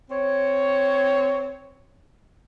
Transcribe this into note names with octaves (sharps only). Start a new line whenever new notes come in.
C4 C#5